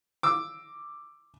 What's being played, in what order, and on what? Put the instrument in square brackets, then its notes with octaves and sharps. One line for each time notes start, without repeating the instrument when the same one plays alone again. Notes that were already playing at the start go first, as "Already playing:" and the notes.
[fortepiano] D6 E6